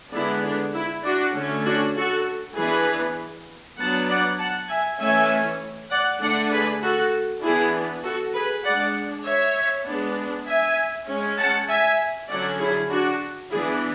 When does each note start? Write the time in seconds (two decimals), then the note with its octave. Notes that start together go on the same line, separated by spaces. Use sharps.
0.14 D3 G#3 B3 D4 E4
0.44 D4
0.74 E4
1.04 D4 F#4
1.36 D3 A3 C#4
1.66 D4 F#4
1.97 F#4 A4
2.57 E3 B3 D4 G#4 B4
3.78 F#3 B3 D4 F#5 A5
4.09 D5 F#5
4.39 F#5 A5
4.70 E5 G#5
5.00 E3 A3 C#4 E5 G#5
5.91 D5 F#5
6.21 D3 A3 D4 D5 F#5
6.51 G#4 B4
6.83 F#4 A4
7.43 E3 B3 D4 E4 G#4
8.04 F#4 A4
8.35 G#4 B4
8.65 G#3 D4 D5 F#5
9.25 C#5 E5
9.87 G#3 B3 D4
10.47 E5 G#5
11.08 G#3 C#4
11.39 F#5 A5
11.69 E5 G#5
12.29 D3 F#3 C#4 D5 F#5
12.60 E4 G#4
12.90 D4 F#4
13.51 E3 B3 D4 E4 G#4